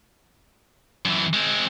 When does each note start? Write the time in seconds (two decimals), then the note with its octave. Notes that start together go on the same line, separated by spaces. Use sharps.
1.05 F#2 E3
1.33 G#3 C4